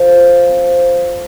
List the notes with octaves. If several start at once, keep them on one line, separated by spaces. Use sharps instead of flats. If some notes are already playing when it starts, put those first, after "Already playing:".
Already playing: F3 A4
F4
C4
C5